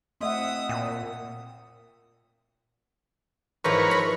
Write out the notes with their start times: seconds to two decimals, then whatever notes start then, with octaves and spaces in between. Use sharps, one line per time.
0.21 A3 C4 D#5 E5 F#5 C6 D#6
0.69 A#2 G5
3.64 G#2 E3 F3 A#4 B4 C#5
3.91 B5